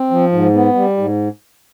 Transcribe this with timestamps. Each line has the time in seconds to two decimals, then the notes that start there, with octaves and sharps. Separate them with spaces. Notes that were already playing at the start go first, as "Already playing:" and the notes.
Already playing: C4
0.11 F3
0.32 G#2
0.54 B3
0.75 G3
0.97 G#2